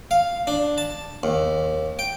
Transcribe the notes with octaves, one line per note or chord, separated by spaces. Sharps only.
F5
D4
A5
D#2
G5